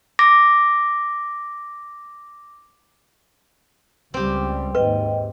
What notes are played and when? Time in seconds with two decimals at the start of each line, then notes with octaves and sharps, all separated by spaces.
0.19 D6 A#6
4.14 C#2 G3 C4 G4
4.75 D#2 G#2 B4 D#5 G5